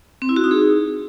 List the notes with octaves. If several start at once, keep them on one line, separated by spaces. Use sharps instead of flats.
C4
E4
F#4
D#4
G#4